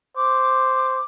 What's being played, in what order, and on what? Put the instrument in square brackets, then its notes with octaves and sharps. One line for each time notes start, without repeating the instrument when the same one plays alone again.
[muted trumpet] C5 [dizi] D6